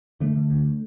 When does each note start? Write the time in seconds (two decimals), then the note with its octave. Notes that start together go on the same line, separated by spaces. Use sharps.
0.20 D3 A3
0.35 D3
0.50 D2